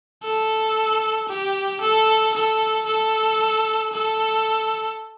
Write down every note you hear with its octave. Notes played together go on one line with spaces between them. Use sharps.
A4
G4
A4
A4
A4
A4